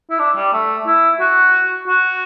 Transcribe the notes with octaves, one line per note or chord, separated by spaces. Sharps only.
E4
D4
G3
A3
E4
F#4
F#4